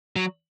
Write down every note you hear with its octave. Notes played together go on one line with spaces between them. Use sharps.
F#3